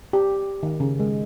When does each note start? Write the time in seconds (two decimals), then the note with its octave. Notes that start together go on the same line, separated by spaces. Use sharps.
0.13 G4
0.63 D#3
0.80 C#3
1.00 G#3